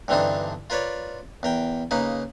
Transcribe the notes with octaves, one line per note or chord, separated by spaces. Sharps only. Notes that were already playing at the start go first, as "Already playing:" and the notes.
G2 D3 E3 C4 D4 D#4
F4 A#4 B4 C#5 D5
E2 A#4 G5
C#3 A#3 D#4 B4